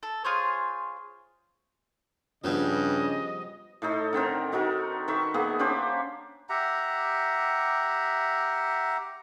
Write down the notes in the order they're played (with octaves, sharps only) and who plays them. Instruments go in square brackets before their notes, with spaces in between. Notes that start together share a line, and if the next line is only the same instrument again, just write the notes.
[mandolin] A4
F4 G#4 C5 C#5
[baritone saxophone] G2 [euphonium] C#3 [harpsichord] F3 G3 B3 [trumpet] D#5
[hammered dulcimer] A2 D#4 A4
D3 D#3 C4 A#4
D#4 F#4 A4 A#4
D#3 B4 E5 C#6
A#3 B3 G#4 F#5
C#4 D4 G4 C5
[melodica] G4 E5 F#5 A#5